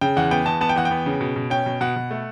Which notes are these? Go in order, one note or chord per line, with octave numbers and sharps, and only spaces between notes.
C#3 G5
E2 F#5
B3 G5
E2 A5
B3 A5
G5
E2 F#5
G5
B3
C#3
B2
B2
C#4 G5
B2
B2 F#5
B2
A3